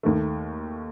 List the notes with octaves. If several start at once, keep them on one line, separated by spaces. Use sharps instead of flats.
D#2 D#3 A3